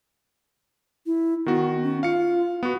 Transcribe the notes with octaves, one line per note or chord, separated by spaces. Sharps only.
E4
D#3 B3 F#4
C#4
F4 F5 C#7
B3 F#4